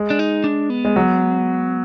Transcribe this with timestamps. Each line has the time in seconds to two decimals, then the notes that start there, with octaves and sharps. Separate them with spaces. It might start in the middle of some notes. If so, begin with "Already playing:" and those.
Already playing: G#3
0.10 D4
0.19 D#4
0.44 D4
0.70 B3
0.85 G#3
0.96 F#3